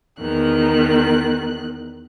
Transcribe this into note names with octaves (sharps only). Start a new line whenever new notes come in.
E2 D#3 F#6